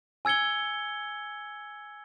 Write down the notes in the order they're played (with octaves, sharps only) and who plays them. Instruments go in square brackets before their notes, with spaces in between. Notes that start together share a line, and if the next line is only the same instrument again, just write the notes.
[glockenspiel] G#5 E6 G#6 C#7 G7